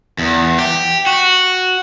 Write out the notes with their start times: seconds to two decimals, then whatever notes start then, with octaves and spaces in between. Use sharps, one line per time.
0.18 E2
0.59 G4
1.07 F#4